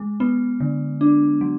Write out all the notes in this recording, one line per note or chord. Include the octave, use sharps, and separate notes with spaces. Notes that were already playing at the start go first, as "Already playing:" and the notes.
Already playing: G#3
B3
D3
D4
F#3